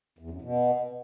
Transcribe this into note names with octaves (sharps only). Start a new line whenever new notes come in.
E2
F#2
B2